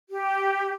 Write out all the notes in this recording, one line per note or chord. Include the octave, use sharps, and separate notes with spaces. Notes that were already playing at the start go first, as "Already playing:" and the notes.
G4